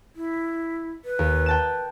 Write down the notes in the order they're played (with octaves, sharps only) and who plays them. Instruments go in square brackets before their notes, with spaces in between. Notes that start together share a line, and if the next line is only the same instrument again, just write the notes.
[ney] E4
B4
[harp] D#2
G5 A5 E7